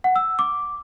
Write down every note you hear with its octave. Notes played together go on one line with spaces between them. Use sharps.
F#5
E6
D6